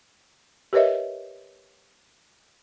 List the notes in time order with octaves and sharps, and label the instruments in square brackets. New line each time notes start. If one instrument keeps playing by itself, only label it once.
[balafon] G4 A#4 B4 C#5 D#5 E5